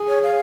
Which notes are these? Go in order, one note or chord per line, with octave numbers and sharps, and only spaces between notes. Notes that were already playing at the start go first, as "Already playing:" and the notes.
Already playing: G#4
C#5
F5